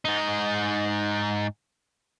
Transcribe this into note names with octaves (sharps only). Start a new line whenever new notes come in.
G#2 D#4